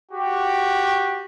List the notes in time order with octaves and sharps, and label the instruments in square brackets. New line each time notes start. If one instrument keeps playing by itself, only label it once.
[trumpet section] F#4 G4